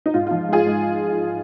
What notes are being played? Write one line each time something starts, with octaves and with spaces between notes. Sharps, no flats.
D#4
G#2 F4
F3 F4
G#3 F4 G#4
G#3